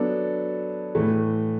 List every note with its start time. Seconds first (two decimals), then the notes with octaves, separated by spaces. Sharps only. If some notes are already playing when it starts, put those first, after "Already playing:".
Already playing: F#3 B3 D4 A4
0.95 A2 E3 A3